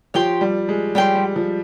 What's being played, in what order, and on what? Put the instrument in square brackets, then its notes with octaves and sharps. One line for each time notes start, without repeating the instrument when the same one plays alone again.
[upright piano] F3 [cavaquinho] G4 C#5 G5 C6
[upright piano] G3
G#3
[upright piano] G3 [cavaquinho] G4 C#5 G5 C6
[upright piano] G3
F3